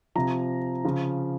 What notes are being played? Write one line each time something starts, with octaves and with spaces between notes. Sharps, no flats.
C3 F3 A#5
C#3 F3